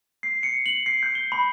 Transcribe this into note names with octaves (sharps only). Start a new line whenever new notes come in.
C7
C#7
F#7
C7
G6
G7
B5